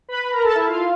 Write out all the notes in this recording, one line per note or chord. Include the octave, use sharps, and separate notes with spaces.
B4 B5
A#4 A#5
A4 A5
E4 E5
F4 F5